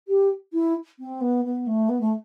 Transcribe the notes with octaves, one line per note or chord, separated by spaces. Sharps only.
G4
E4
C4
B3
B3
A3
B3
A3